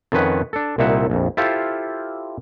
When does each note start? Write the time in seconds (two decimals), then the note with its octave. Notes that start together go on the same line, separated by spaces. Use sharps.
0.12 F2 D#3 F3 C#4 B4 F#5
0.53 D4 A4
0.78 C2 A#2 D#4 E4 E5 F#5
1.10 A#1 F2
1.37 E4 F4 G4 A4 C5 F5